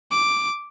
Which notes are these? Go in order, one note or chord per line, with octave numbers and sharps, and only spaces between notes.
D6